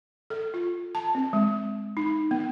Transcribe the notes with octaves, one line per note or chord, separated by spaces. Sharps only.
A4
F4
A5
C4
G#3
D#4
B3